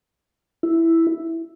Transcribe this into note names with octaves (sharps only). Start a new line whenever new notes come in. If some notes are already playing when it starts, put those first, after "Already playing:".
E4